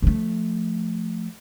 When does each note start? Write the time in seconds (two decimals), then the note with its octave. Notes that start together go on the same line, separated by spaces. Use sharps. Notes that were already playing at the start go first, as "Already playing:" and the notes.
0.02 F3 A3